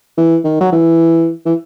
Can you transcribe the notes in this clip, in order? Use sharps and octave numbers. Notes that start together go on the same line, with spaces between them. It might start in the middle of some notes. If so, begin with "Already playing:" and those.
E3
D#3
F#3
E3
E3